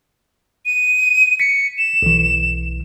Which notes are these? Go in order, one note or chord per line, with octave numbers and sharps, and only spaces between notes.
D#7
B6 C#7
E7
B1 E3